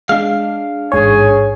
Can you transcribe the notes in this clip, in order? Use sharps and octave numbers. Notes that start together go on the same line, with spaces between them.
G#3 D4 F5
A1 G#2 G#4 C#5 G#5